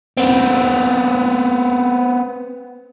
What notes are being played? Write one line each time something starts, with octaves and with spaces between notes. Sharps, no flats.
B3 C4